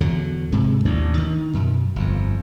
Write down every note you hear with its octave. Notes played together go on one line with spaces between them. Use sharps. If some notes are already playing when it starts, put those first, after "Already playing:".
E2 D3 F#3
G#2 C3 G#3
A1 D#2 A2 D4
D#3
F#2 B2
G1 F2